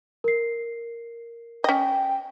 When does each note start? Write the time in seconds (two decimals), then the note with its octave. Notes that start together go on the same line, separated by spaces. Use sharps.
0.24 A#4 C7
1.64 C#4 D#5 G5